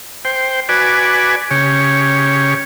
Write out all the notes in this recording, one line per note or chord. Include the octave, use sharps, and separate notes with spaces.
C5 G5
F#4 B4 D5 G#5
C#3 G4 C#5